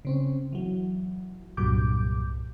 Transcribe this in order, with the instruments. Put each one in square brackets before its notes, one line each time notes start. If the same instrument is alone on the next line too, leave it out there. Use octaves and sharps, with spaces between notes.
[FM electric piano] C#3 C4 C#4
E3 F#3
C2 G2 A#2 F#3 D6 G6